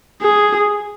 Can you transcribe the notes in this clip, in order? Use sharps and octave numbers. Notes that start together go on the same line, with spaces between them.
G#4